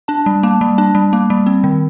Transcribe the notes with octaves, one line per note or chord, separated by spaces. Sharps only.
D4 A5
G3
A#3 A5
G3
D4 A5
G3
A#3
G3
C4
D#3